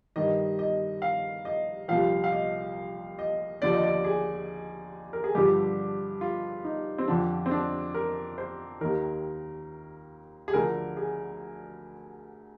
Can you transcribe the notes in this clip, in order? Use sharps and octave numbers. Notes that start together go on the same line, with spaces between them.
G2 D#3 D#5
D#5
F5
D#5
C2 A#2 F3 F5
F5
D#5
D#5
D#2 D3 F3 D5
D#5
D5
G#4
A#4
G#4
G2 D3 F3 G4
F4
D#4
C4
F2 D3 F3 D4
C4
D4
A#4
C5
D#2 D#3 A#4
G#4
D2 D3 F3 A#4
G#4